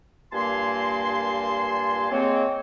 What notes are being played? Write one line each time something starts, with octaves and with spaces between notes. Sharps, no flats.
G2 A#2 A#3 G#5 A5 C6
G#3 A#3 C4 C#5